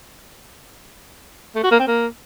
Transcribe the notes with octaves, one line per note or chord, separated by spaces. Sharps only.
A3
F#4
A#3
C4
A#3